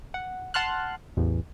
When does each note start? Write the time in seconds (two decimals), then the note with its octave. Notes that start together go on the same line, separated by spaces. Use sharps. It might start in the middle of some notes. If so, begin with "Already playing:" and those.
0.14 F#5
0.54 F#5 A5 C6 F6 F#6
1.17 A1 E2